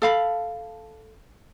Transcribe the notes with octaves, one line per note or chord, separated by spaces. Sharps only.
A4 F5 B5